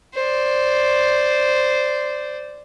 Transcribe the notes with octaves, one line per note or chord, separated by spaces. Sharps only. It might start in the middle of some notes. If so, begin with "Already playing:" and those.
C5 D5